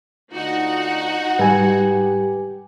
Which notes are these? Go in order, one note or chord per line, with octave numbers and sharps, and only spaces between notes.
D2 D#4 F4 F#4 F#5
G#2 G3 G4 B4 G#5